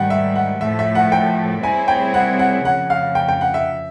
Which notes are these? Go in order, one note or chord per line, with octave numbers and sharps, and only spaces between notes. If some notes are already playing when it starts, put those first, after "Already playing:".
Already playing: G#2 D#3 G3 F#5 G5
E5
F#5
A2 F3 A3 E5
E5
F#5
G5
G3 C4 E4 G#4 C#5 G#5
G5
F#5
F#5
F2 C#3 F3 F#5
F5
G5
G5
F#5
E5